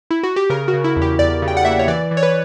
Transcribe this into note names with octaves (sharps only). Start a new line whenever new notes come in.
E4
F#4
G4
C#3 A#4
F#4
C#3
E4
E2
G4
E2 D5
C#3
G5
F#5
A#3 E5
C#5
E3 D5
E3
C#5
B4